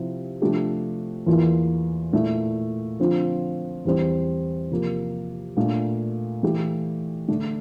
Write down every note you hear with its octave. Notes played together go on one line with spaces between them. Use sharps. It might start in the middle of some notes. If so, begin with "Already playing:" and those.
Already playing: C3 F3 C4 E4
C3 F3 A3 D4 G4
E2 E3 A#3 F4
A#2 A3 E4
D3 F3 C4 F4
E2 E3 G3 C4
C3 F3 A#3
A#2 A3 D4
E3 A3 E4 G4
D3 A3 D4